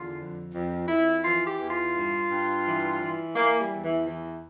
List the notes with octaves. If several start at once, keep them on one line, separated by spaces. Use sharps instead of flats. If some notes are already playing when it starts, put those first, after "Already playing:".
Already playing: E2 D3 F4
F2
F2
F2 E4
E3 F4
G4
E2
F4
G2
G2
E3
E3
E3 A#3
G3
E2
E3
E3